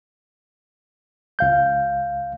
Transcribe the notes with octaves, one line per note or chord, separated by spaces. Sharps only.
C#2 F5 G6